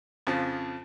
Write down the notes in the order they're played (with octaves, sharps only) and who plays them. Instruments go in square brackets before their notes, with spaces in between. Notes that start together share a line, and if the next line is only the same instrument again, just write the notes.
[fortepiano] F2 C#3 F3